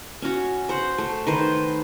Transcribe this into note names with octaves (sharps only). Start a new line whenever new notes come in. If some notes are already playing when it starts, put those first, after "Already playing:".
C#4 F#4
C5 F#5
A3
D#3 B4 C5